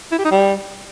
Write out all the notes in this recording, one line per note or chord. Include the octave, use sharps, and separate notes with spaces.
E4
G4
D#4
G3